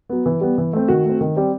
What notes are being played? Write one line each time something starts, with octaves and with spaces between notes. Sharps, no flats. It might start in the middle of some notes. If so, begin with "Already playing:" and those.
F#3 B3
E3
G3 B3
E3
A3 C4
D#3 F#4
A3 C4
D#3
G3 C4